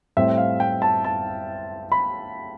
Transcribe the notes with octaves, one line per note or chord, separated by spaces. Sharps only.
A2 G3 C4 E5
F5
G5
A5
A5
B5